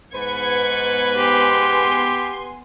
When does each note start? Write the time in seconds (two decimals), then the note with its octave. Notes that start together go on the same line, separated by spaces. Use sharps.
0.14 G#2 B3 B4 G#6 C#7
1.17 B3 G4 G#5 C6